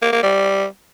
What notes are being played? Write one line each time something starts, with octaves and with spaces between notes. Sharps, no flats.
A#3
A#3
G3